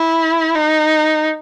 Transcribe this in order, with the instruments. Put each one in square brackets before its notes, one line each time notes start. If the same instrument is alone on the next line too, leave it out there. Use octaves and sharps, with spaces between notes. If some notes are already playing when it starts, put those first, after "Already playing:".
Already playing: [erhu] E4
D#4